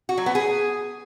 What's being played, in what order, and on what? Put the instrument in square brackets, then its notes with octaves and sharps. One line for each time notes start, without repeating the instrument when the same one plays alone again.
[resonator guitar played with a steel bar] F#4
F#3
B3
G#4